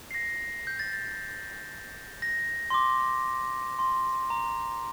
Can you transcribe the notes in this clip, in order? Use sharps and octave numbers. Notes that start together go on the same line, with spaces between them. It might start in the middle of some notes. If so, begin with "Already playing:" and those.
C7
A#6
G6
A6
A6
A6
A#6
C6
D6
C6
A#5